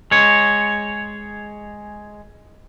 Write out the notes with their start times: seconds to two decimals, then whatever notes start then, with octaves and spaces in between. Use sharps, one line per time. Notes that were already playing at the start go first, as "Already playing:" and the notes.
0.11 G#3 C#5